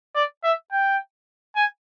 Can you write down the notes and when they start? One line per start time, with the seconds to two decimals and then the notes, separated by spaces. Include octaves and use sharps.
0.15 D5
0.44 E5
0.71 G5
1.56 G#5